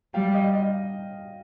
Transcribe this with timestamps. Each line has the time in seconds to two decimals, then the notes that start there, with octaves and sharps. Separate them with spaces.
0.14 G3 F5 G5
0.34 D#5 F5
0.55 D#5 F5